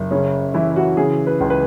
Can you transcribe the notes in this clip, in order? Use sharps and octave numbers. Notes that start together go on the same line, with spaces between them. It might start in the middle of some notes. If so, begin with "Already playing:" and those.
Already playing: F#1
C#3 C#4
E3 E4
F#4
C#3 G#4
B4
C#2
B4